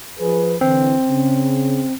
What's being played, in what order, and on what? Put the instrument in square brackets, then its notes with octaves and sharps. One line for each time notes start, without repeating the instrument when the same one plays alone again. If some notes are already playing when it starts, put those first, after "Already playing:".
[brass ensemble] F3 G#4 B4
[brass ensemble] D3 E3 [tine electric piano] C4
[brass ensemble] C#3